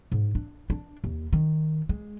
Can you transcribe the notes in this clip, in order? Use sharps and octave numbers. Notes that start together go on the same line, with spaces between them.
G#2
D4
D4
D#2
D#3
G#3